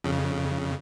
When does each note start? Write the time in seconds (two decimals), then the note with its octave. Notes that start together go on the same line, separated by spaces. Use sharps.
0.04 F2 C#3